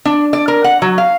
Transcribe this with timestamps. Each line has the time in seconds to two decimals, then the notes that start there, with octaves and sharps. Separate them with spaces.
0.05 D4
0.33 D5
0.48 A#4
0.64 F#5
0.82 F#3
0.98 F5